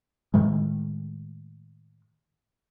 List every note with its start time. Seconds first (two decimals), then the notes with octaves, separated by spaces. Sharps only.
0.34 A2 D#3 G#3